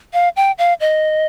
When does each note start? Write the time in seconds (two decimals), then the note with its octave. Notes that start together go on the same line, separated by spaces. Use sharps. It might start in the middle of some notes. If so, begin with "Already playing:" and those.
0.13 F5
0.36 G5
0.58 F5
0.80 D#5